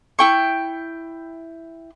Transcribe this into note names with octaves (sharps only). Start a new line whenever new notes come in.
E4 G5 C#6